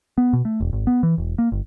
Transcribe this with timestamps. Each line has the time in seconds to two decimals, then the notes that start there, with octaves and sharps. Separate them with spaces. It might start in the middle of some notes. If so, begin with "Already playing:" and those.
0.18 B3
0.33 B2
0.45 A3
0.61 E1
0.73 G#1
0.87 B3
1.03 E3
1.18 E1
1.38 A#3
1.52 G1